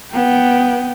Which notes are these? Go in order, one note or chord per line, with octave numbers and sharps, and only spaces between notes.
B3 G5